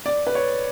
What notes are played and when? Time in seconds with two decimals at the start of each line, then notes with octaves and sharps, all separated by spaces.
0.06 D5
0.27 B4
0.35 C#5